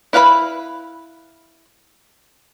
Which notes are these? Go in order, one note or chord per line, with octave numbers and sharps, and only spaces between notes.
E4 B4 F5 A#5 B5